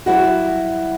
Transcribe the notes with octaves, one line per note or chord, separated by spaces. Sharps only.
F#3 G3 E4 F#4